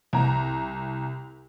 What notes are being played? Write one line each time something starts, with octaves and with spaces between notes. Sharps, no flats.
C2 A#5